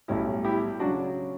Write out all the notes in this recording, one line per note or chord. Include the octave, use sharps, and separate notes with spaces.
B1 A2 G3 C#4 E4
E4 G4
C#3 F#3 D4 F#4